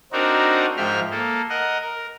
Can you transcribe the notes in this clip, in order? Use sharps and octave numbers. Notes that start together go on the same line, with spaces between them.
C4 D4 D#4 F#4 A#4
G#2 F3 E5 G5 F6
A#3 A4
A#4 D#5 F#5
A#4